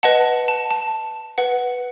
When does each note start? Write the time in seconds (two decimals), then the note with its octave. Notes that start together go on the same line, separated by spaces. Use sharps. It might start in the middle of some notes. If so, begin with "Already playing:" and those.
0.03 B4 D#5 F#5 A5
0.48 A5
0.71 A5
1.38 B4 F#5